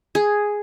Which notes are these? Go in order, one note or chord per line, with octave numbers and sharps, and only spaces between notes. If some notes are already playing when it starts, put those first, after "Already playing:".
G#4